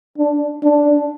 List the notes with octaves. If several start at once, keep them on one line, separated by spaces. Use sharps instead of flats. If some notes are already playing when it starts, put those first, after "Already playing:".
D4
D4